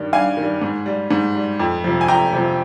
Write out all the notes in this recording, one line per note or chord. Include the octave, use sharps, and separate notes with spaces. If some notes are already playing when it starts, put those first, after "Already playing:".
Already playing: G2 D#3 G3
G2 F5 G#5
D#3 G3
G#2
G3
G#2
G3
F2
C3 F3
G#5
F2 G5 A#5
C3 F3